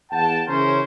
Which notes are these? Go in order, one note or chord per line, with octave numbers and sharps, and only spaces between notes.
E2 F#5 G5 A5
C#3 E3 C#4 A#4 C5 C#5